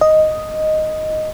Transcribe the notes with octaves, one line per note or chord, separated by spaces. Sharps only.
D#5